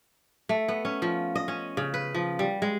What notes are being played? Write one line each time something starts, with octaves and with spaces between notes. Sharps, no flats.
A3
B3
C#4
F3
D#5
C#4
C#3
B4
F3
G3
G#3